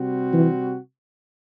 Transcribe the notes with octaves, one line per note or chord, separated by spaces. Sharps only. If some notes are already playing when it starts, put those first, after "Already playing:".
Already playing: C3 G3 C4 F#4
E3